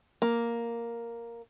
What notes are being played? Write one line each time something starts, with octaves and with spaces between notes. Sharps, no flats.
A#3